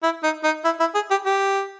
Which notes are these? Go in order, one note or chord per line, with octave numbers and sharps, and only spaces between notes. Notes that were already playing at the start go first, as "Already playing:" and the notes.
E4
D#4
D#4
E4
E4
G#4
G4
G4